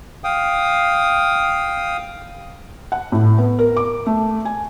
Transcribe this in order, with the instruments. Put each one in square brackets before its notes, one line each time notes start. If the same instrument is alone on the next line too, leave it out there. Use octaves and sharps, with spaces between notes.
[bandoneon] F5 G5 D#6
[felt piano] F#5
A2
B3
A#4
D6
A3
G#5